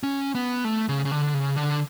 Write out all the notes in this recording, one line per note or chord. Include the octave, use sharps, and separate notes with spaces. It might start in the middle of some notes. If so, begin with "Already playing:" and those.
C#4
B3
A3
C#3
C#3
D3
C#3
D3